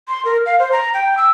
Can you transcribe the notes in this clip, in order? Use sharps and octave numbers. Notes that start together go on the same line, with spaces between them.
C6
A#4
F5
C5
A#5
G5
E6